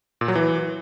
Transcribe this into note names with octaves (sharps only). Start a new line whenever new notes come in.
A#2
F#3
E3